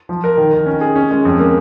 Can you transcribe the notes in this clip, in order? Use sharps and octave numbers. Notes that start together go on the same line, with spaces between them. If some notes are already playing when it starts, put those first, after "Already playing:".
F3
A#4
D#3
D#3
C#4
G#4
C#4
G#3
F2
A#3